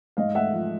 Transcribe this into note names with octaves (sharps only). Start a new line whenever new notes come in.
G#2 D#5 F5
A3 E5 F#5
F3